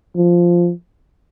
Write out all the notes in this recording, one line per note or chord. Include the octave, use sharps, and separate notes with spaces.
F3